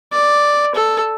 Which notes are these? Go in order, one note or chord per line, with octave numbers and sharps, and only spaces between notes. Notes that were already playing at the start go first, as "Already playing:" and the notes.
D5
A4